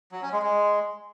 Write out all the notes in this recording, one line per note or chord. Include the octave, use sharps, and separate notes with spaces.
F#3
C#4
G#3
G#3